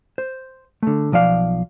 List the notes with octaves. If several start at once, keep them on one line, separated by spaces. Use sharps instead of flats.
C5
D3 A3
B1 F3 D5 F5